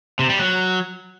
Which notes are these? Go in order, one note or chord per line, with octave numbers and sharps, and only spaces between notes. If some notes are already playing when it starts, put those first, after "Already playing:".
C3
G3
F#3